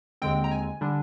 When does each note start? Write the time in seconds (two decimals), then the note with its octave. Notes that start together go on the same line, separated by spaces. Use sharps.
0.22 D#2 D3 G#3 C4 G5
0.44 A#5
0.51 G#5
0.81 D3 G3 D4